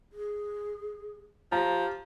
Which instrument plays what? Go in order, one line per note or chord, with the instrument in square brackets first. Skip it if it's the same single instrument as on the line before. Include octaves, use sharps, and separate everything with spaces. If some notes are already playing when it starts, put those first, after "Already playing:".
[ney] G#4
[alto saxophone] F3 [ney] G4 [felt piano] A#5